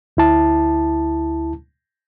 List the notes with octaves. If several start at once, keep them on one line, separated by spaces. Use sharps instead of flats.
D2 E4 A5